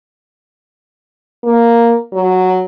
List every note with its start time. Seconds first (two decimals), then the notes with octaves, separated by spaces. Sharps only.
1.44 A#3
2.13 F#3